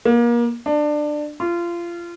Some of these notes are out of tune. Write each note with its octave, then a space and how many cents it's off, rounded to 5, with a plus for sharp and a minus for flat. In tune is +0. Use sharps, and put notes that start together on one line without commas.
A#3 +30
D4 +20
F4 -25